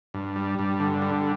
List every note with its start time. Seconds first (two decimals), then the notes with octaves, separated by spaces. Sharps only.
0.14 G2
0.36 G3
0.59 G2
0.80 D3
1.02 G3